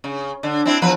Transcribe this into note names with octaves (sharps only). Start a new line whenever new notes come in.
C#3
D3
C4 D4 E4
E2 F3 B4